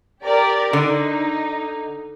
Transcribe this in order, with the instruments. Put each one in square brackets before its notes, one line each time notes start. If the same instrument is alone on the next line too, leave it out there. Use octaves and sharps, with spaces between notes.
[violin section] G4 A#4 D5
[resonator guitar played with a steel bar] D3 [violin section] D#4